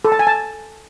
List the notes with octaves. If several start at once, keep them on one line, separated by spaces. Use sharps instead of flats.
A4
A5
G#5
A5